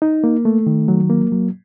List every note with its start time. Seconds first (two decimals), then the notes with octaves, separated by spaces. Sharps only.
0.02 D#4
0.24 A#3
0.45 A3
0.67 D#3
0.88 F#3
1.10 A#3
1.32 F#3